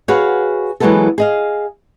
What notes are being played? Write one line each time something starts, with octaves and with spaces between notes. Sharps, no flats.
F#4 G#4 B4 C#5 F5
E3 F#3 G#3 A#3 B3 A4
G#4 D#5 F5